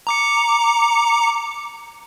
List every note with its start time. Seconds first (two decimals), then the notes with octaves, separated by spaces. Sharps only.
0.07 A#5 D6 C#7